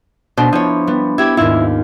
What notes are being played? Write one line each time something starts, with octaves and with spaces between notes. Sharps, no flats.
B2 D4 C5
F3 B3 E4 C#5
G3 B3
E4 G4 B5 D6 G#6
D#2 G#2 E4 F4